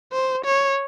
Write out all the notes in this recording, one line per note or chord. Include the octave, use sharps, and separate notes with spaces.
C5
C#5